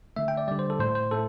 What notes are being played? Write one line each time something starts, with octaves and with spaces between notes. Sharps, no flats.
D3 A3 E5
G5
D5
D3 G3 D5
C5
A4
A2 A3 C5
C5
A2 A3 A4